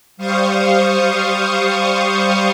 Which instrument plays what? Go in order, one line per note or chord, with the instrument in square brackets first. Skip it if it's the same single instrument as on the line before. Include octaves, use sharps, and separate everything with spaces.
[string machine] G3 C5 F5 C#6 D#6